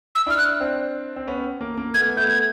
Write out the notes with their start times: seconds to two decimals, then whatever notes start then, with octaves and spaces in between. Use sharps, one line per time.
0.15 E6
0.26 D4 E4 F6
0.38 F#6
0.60 C4 D4
1.16 C4
1.27 B3 C#4
1.61 A#3
1.78 A#3
1.94 A3 B3 G#6
2.17 A3 B3 G6
2.28 G#6